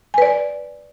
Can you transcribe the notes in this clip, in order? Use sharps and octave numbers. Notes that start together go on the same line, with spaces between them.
B4 D5 G#5